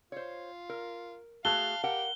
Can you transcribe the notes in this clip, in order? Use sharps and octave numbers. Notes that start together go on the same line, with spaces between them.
F4 C5 C#5
A#4
A3 F#4 G#4 F5 A5 F#6 G7
G4 A#4 F5 F#5